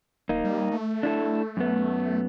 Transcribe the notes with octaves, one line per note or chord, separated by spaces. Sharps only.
D1 A#3 D#4
G3
A3
D4 E4 A4
F#2 B3